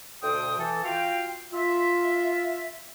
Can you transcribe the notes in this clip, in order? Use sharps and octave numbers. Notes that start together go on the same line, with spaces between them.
D2 B2 A4 C5 G5 D#6
E3 A4
F4 F#4 F5 G5
F4 E5